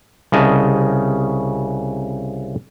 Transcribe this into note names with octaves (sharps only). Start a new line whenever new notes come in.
C2 C#3 D#5 A5